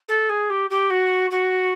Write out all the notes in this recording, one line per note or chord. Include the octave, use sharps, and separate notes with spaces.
A4
G#4
G4
G4
F#4
F#4